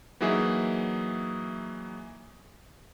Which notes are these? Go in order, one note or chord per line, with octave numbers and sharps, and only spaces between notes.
E3 F#3 A#3 D#4 G#4 E5